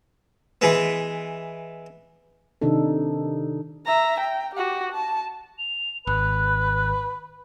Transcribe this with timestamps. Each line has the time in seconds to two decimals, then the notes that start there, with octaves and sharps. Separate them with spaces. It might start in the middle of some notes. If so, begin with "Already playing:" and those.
0.61 E3 G#3 B3
2.61 C3 D#3 D4 D#4 A4
3.85 E5 A#5
4.20 G5
4.55 F#4 G4
4.92 A5
5.59 F7
6.07 G#1 B4 F#6